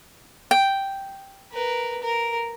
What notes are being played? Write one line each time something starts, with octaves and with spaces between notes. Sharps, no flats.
G5
A#4 B4
A#4